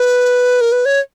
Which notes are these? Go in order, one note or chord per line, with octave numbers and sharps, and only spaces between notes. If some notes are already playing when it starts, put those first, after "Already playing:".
Already playing: B4
A#4
B4
C#5